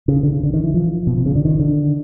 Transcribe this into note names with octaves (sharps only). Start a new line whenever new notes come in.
C#3
D3
C#3
D3
D#3
E3
F3
B2
C3
C#3
D3
D#3
D3